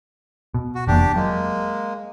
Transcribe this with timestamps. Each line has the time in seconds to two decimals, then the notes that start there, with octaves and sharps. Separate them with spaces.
0.54 B2
0.75 F#4
0.87 F1 E2 A#3 D4 G4
1.16 F#3 G#3 A#3